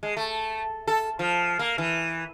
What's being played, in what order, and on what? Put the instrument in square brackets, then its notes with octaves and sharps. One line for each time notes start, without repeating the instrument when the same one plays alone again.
[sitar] G#3
A3
A4
F3
A#3
E3